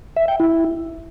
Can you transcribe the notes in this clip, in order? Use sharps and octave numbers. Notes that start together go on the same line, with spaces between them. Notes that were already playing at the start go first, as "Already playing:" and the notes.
E5
G5
E4